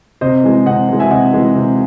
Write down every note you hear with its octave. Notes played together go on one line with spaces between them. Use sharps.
C3 C5 D#5
E3 G#3
C3 D#5 F#5
E3 G#3
E5 G#5
C3 D#5 F#5
E3 G#3
C3